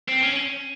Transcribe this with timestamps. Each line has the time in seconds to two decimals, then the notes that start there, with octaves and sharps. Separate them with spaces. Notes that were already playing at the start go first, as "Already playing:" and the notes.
0.08 C4
0.23 C#4